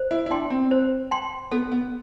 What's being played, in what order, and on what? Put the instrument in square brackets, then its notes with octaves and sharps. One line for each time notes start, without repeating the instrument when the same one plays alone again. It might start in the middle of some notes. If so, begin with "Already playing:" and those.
Already playing: [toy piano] C5
[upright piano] E4
E4
[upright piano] D4 [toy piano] G5 C6
[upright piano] C4
[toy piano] C5
G5 C6
[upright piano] B3 [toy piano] A4
[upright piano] B3